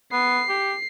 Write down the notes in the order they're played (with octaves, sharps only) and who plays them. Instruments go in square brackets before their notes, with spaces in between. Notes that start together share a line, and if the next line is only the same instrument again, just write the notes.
[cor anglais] B3 [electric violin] C7
[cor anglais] G4